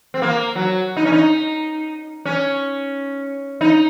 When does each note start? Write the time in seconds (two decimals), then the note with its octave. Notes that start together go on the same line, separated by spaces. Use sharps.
0.14 C4
0.22 A#3
0.55 F#3
0.97 D#4
1.05 C#4
1.12 D#4
2.25 C#4
3.61 D#4